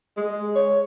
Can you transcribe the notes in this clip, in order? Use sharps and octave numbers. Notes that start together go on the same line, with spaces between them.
G#3
C#5